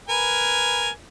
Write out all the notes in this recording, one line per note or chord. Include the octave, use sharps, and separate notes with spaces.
A#4 B4 G#5